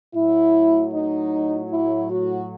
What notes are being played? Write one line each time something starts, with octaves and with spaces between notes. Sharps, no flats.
A2 F#3 E4
D#4
E4
F#4